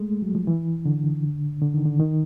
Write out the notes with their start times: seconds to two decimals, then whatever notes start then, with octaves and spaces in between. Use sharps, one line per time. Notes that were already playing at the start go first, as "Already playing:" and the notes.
Already playing: G#3 A3
0.22 F#3
0.35 F3
0.47 E3
0.85 D3
1.62 D3
1.74 D#3
1.86 D3
2.00 D#3